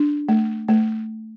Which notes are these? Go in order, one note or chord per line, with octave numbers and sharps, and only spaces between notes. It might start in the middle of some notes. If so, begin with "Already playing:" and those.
Already playing: D4
A3
A3